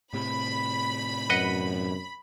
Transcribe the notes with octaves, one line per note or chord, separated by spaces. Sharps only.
A2 C3 B5
F#2 B4 D#5 F#5